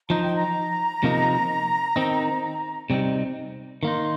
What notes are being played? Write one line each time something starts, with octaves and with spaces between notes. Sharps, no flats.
F3 D#4 A#5
G5
A#5
C3 F3 A#3 D#4
D#3 C4 D#4
C3 G3 C4 D#4
D#3 A#3 D#4 C6